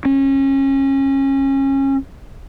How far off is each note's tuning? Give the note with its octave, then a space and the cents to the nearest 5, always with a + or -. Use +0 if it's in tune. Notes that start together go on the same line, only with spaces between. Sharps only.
C#4 -25